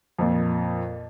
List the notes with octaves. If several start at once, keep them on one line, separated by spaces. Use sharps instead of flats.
F2 A#2